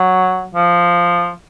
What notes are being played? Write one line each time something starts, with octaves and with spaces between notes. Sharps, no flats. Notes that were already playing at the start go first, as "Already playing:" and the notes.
Already playing: F#3
F3